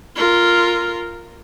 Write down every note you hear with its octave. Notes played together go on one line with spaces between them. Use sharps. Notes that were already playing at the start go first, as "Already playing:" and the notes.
F4 A#4